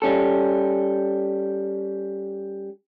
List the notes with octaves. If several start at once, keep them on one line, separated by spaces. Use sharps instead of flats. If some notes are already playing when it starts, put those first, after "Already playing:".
G3 C#4 A4